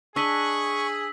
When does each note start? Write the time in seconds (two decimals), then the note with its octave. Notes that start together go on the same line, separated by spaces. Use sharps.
0.16 D4 G#4 D#5 C#6 E6 B6 F#7